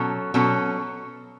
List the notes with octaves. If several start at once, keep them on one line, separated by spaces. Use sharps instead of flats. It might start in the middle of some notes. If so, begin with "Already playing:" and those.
Already playing: B2 F#3 C#4 A4
B2 F#3 C#4 A4